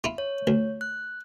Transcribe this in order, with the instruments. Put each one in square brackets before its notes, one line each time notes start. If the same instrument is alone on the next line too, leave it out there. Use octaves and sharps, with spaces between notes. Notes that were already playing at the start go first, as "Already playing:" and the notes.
[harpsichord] E4 F4
[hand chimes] C#5
[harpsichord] D2
[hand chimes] F#6